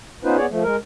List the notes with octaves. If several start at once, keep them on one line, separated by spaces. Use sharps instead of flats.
B3 C#4 D#4 F4 B4 C5
B3 G#4 C#5 D5
F3 A3
G#3 A#4